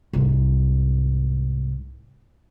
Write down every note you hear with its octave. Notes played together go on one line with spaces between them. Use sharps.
C2 G#2